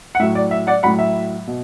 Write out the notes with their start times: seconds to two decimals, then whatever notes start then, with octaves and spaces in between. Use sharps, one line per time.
0.15 F#5
0.20 A2 F#3 E5
0.35 D5
0.51 E5
0.67 D5 F#5
0.83 F#3 F#5 B5
0.86 A2
0.99 E5
1.48 B2